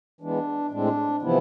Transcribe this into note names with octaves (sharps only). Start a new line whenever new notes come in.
E3 G#3 B3 D4
A2 G#3 C4 D4
C3 E3 F3 B3 E4